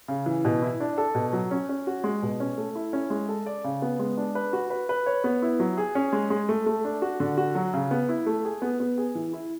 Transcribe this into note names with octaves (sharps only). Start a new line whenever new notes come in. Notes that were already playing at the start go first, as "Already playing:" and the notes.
C#3
E3
B2
E4
D4
A4
B2
F#3
C#4
C#4
F#4
G#3
B2
C#4
A3
E4
C#4
G#3
A4
D5
C#3
B3
G#3
D4
B4
F#4
B4
B4
C#5
B3
E4
F#3
G#4
C#4
G#3
G#3
A3
A3
D4
F#4
D3
F#4
F#3
C#3
B3
E4
A3
G#4
B3
B3
G#4
E3
E4